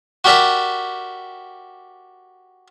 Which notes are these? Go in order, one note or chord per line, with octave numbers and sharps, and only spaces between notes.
F#4 G4 A#4 D5 E5 F#5